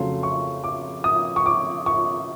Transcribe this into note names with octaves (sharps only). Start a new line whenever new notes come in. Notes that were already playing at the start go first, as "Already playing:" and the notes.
Already playing: F2 C#3 F#3 A3 C6
C#6
D6
D#6
C#6
D6
C#6